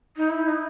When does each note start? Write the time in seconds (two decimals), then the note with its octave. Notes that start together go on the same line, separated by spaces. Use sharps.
0.16 D#4
0.29 E4
0.46 D#4